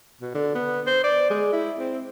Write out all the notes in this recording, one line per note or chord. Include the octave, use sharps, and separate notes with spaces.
B2
D3
B3
C5
D5
G#3
E4
C4